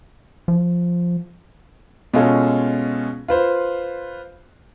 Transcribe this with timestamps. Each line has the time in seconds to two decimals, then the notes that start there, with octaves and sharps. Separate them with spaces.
0.48 F3
2.14 B2 G#3 C#4 F4 A4
3.28 F4 B4 C5